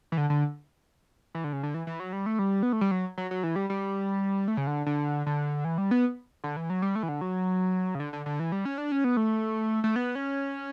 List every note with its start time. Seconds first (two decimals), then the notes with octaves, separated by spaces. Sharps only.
0.12 E3
0.17 D3
0.30 D3
1.35 E3
1.44 D3
1.53 C#3
1.63 D3
1.74 E3
1.87 E3
2.00 F#3
2.13 G3
2.26 A3
2.39 G3
2.63 B3
2.73 A3
2.81 G3
2.91 F#3
3.18 F#3
3.31 F#3
3.43 E3
3.56 G3
3.70 G3
4.48 A3
4.57 C#3
4.67 D3
4.86 D3
5.26 D3
5.65 E3
5.78 G3
5.91 B3
6.44 D3
6.57 E3
6.70 F#3
6.82 G3
6.95 A3
7.03 E3
7.09 D3
7.21 F#3
7.95 C#3
8.00 D3
8.13 D3
8.26 D3
8.40 E3
8.52 G3
8.65 C#4
8.78 D4
8.92 C#4
9.04 B3
9.17 A3
9.84 A3
9.96 B3
10.15 C#4